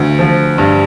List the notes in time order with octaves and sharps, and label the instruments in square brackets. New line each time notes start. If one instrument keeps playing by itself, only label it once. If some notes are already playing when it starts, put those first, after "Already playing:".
Already playing: [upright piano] D2
F3
G2